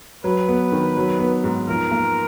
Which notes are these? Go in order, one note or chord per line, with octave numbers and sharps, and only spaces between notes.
F#3 B4
B3
D#3
F#3
B3
G#2
F3 A#4
A#3